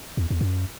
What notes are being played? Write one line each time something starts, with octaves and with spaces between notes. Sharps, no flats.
E2
E2
F#2